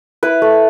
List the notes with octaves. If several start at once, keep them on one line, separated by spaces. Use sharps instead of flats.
E4 B4
A3